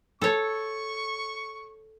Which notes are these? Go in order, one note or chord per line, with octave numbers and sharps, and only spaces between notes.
A4 C#5 C#6